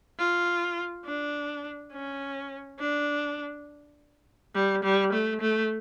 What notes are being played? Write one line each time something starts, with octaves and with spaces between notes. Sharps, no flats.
F4
D4
C#4
D4
G3
G3
A3
A3